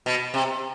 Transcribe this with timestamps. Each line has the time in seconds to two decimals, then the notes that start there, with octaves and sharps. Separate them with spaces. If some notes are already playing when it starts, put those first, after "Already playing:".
0.06 B2
0.34 C3